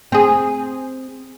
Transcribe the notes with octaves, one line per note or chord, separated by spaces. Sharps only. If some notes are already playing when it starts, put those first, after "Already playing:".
C4 G#4